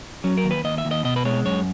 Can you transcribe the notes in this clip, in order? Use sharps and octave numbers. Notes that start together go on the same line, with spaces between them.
F#3 C#4
A#4
D#2
B4
D#2 D#5
E5
D#2
D#5
B2 D#5
B4
G#3 C#5
F#2 C#5